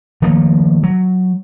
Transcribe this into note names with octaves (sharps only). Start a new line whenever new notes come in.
D#3 F3 A3 A#3
F#3